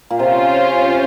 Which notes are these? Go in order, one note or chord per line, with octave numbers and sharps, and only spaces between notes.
A#2
C3 C#4 F4 C5